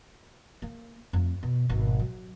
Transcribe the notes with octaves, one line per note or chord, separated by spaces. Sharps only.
A#3
F2 A3
B2
G#1 B2
F#3